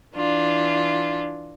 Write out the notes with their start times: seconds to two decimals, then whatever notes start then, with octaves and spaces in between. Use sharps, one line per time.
0.16 E3 D4 F4